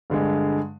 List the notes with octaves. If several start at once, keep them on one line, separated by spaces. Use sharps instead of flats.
G2 D3 G#3